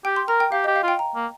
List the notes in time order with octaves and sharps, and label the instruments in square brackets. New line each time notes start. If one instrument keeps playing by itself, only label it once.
[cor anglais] G4 [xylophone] G5
[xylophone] C6
[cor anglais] A#4 [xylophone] A#5
[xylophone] G5
[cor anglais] G4 [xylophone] F5
[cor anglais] G4 [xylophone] D#5
[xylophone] F5
[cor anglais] F4 [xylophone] G5
[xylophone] A#5
[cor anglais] A#3